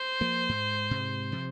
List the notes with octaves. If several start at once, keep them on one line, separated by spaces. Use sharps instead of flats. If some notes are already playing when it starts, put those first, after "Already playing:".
Already playing: C5
F3 A#3
G#2
G#2 C3
C3 F3